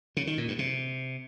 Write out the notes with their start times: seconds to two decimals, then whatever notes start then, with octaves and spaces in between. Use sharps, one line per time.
0.17 C#3
0.27 D#3
0.38 A#2
0.48 G2
0.59 C3